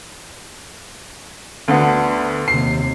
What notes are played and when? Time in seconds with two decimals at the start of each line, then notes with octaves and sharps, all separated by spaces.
1.68 D2 D3 B3
2.48 D#2 C3 C7